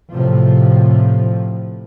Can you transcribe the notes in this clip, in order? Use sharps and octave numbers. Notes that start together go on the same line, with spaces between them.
A2 C3 F3